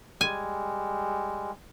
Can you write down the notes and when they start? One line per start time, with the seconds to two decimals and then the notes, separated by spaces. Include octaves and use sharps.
0.21 G3 G#3 G#5